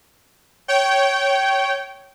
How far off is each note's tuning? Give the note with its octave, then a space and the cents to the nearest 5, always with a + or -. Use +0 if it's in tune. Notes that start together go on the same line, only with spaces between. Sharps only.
C#5 +0 G5 -20